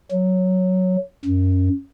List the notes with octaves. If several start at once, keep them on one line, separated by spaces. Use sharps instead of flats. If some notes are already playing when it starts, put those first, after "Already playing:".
F#3
F#2